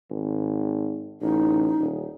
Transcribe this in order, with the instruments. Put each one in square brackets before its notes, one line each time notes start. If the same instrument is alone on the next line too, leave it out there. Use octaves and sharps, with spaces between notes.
[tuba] G#1
[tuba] A1 [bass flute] D#4
[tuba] D#1